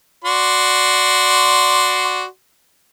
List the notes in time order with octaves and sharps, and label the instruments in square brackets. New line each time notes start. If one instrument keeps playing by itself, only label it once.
[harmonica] F#4 D5 C6